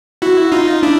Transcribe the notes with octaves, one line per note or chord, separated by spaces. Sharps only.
E4 F#4
D#4 F4
D4 E4